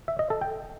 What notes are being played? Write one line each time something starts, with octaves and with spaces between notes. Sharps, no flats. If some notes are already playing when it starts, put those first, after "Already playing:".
E5
D#5
A4
G5